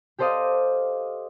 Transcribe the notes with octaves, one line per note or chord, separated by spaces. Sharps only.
G4 A4 C5 D5 D#5 F5